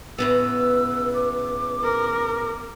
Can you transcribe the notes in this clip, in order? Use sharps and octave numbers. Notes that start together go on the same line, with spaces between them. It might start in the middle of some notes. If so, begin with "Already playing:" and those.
A2 C#3 B3 B4 E6
D6
A#4